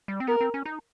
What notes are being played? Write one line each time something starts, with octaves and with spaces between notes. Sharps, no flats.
G3
C4
B3 A#4
C4
C#4
D#4